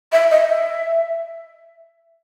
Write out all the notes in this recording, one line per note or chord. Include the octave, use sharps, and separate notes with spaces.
E5
D#5
E5